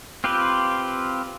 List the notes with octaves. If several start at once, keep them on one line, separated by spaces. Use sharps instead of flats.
C4 F4 G4 B4